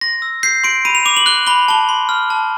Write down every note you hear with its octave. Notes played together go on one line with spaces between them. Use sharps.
C6 A#6
E6
G6 C7
C6 D7
B5 D#7
F7
D6 F7
F#7
F#6 G7
B5 G7
A5 G7
C6
F6
A5